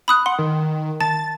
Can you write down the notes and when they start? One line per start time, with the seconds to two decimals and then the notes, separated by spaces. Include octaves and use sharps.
0.08 B5 D#6 F#6
0.26 F#5 C6
0.39 D#3
1.01 A5 A6